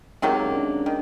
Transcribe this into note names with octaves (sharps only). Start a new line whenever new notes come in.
C3 D#3 F#3 G#3 A#3
C#4
D4
D#3